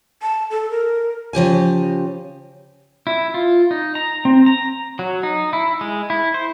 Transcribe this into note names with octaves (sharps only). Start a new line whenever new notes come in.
A5
A4
A#4
C#3 F3 G4 G#5
E4
F4
D#4
A#5
C4
A#5
F#3
D#4
E4
G#3
E4
C5